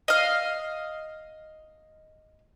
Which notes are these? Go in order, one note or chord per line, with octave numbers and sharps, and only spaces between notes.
D#5 F5